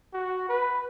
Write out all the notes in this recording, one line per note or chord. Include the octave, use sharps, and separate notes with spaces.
F#4
B4